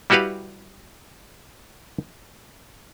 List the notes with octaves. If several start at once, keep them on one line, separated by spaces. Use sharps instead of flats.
G3 E4 F#4 G4 B4 F5